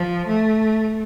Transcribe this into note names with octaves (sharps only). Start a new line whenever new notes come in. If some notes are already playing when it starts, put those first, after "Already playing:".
Already playing: F3
A3